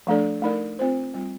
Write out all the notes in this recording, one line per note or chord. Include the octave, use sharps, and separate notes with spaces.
F3 A3 D4 A4 D5
A3 D#4 A#4 D5
C4 F4 C5
G3 C4 F4